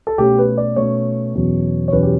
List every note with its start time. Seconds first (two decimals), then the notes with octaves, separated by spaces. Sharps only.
0.07 A4
0.18 B2 A3 C#4 G4
0.38 B4
0.57 D5
0.76 B2 A3 C#4 C#5
1.35 E2 B2 F#3 C#4
1.88 C#5
1.92 E2 B2 F#3 C#4 B4
2.03 G4